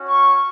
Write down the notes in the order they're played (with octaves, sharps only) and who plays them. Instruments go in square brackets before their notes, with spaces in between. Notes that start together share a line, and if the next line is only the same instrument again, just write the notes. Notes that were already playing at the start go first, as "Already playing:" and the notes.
Already playing: [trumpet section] C#4 F#4
C#6